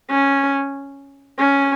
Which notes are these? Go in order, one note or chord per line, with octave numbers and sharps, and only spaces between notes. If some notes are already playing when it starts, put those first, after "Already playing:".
C#4
C#4